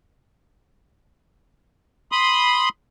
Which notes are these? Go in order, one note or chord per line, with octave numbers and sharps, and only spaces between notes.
B5 C6 D#6